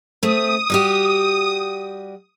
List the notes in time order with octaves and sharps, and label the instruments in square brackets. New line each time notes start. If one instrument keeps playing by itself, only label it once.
[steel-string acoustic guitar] A3 C4 [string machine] D#6
[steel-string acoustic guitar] G3 F#4 G4